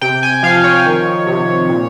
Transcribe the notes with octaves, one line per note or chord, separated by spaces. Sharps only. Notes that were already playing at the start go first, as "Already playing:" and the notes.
C3 G5
G#5
F3 F5
C#5
D#3
C3
A#2